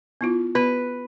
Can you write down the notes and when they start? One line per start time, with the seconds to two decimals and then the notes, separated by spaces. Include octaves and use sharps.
0.21 B3 E4 F4
0.55 B3 B4